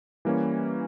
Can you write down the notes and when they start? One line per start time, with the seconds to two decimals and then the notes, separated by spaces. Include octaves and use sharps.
0.25 E3 G3 A#3 C#4